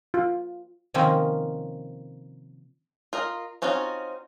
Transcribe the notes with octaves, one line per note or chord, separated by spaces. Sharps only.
F4
C3 D#3 F3 A#3 C4 C#4
F4 A#4 D#5
C4 C#4 D#4 F4 F#4